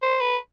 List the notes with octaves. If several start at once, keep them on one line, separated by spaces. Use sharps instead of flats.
C5
B4